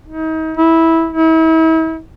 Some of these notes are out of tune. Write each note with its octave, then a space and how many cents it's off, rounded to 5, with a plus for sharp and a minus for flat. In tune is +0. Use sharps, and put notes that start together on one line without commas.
D#4 +35
E4 -10
E4 -40